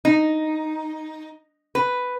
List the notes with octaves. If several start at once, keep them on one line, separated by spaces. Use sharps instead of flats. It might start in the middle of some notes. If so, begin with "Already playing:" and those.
D#4
B4